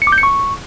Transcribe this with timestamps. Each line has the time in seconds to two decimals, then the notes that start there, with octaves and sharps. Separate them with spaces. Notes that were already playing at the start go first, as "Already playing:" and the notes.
0.02 C#7
0.07 D6
0.12 G6
0.18 C#7
0.23 C#6